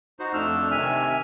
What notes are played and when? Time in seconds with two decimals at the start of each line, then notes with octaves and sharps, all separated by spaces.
0.19 D#4 F#4 C5
0.33 F2 A3 D4 E6 F6
0.71 C3 D#3 E5 G#5 F6